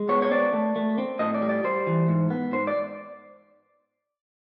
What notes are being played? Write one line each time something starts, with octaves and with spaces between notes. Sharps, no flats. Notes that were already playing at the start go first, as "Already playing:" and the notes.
Already playing: G#3
B3 C#5
C#5
C4 D5
A3
A3
C4
A2 D#5
D5
G3
D5
G3 C5
E3
G#2
B3
G#2 C5
D5